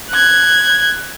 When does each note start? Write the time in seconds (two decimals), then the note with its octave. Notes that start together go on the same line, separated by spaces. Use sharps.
0.10 F#6 G#6